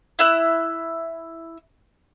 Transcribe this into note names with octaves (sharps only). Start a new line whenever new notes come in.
E4 E5 F#6